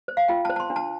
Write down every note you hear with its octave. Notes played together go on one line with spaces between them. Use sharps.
C5
F5
F4 G5
A5
C5
A5
C6
D4
A5